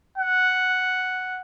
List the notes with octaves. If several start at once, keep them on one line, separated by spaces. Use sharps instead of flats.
F#5